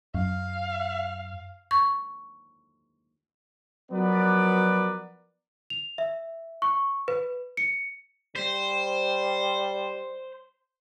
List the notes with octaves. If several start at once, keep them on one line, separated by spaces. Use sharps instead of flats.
F#2 F5
C#6
F3 F#3 B3 A#4 B4 D5
F7
E5
C#6
B4
C#7
G3 C5